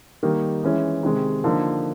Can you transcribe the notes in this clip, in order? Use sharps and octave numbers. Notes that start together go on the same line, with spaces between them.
D#3 G3 A#3 D#4
E3 G#3 C#4 E4
C3 D#3 G#3
D3 F3 A#3 D#4